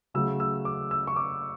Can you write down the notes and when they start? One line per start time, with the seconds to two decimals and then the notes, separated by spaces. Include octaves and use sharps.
0.14 C#3 F#3 A3 E6
0.40 E6
0.65 D6
0.91 E6
1.07 C#6
1.16 D6